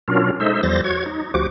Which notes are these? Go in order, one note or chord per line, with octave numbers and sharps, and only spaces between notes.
B2 F#3 C#4 D4 F4 A#4
G#3 D#4 A4 C5 E5
E2 F3 G3 C5 A6 A#6
F#4 C#5 G#6
D#4
D2 F3 F#4 G4 D6